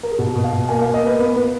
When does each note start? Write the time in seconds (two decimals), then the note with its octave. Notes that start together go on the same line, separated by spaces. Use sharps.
0.03 A#4
0.11 G#4
0.19 B2 F#4
0.36 B2
0.44 F5
0.52 B2
0.69 A#3 G#5
0.82 F5
0.86 A#3
0.94 D#5
1.02 A#3 B4
1.19 B3
1.36 B3